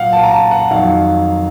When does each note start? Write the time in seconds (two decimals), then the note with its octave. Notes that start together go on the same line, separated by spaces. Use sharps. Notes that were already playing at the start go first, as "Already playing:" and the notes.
Already playing: A#2 F#3 F5 F#5
0.13 A5
0.23 A#5
0.32 A5
0.51 F#5
0.71 F2 D#3 F#3 F5